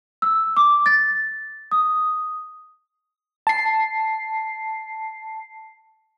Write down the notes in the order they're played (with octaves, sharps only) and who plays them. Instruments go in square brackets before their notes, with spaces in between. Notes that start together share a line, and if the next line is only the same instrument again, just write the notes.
[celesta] E6
D6
A6
D#6
[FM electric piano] A5 C7